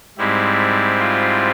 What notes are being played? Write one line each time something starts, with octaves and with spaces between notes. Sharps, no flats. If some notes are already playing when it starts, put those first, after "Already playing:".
G#2 G3 C4 E4
F4